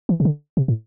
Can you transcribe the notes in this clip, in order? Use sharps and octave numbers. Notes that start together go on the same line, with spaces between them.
E3
C3
D3
C3
A2